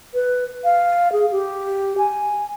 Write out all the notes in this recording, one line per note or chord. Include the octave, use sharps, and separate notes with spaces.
B4
F5
G#4
G4
G#5